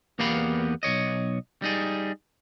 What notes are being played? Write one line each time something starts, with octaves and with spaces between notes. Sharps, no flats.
E2 A#3 B3 G4 F5 B5
B1 E2 C#5 D#5
G3 D#4 G#4